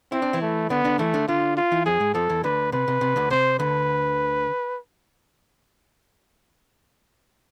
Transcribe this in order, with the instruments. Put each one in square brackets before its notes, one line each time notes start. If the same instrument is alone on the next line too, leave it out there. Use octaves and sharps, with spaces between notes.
[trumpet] C4 [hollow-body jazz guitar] E4
[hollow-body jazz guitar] D4
E3 E4
[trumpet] A3
[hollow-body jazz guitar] D3 D4 [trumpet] B3
[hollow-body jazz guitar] D3 D4
[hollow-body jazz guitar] E3 E4 [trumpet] A3
[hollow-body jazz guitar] D3 D4
[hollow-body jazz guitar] D3 D4 [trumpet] F4
[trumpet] F4
[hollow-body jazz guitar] E3 E4
[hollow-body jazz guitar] F2 F3 [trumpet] G#4
[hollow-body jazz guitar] G#2 G#3
[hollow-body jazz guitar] F2 F3 [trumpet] A4
[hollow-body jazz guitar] E2 E3
[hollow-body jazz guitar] D2 D3 [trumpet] B4
[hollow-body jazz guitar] C3 [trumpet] B4
[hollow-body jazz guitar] C3
C3
D2 D3
[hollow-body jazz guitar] C3 [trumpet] C5
[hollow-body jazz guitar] D2 D3 [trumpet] B4